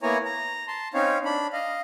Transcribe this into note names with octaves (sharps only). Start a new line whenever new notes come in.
A#3 B3 E4 C#5 G#5 A#5
A#5
A5 C6
C4 C#4 D#4 C#5 F5
D4 B5
D#5 F5